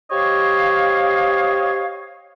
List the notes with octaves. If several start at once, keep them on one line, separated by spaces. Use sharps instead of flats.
G4 C5 C#5 D#5 F5